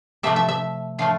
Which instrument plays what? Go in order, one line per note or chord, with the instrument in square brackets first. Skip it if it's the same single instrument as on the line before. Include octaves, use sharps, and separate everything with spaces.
[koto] C3 F3 A3 E5
E5
E5
A2 F3 A3 F5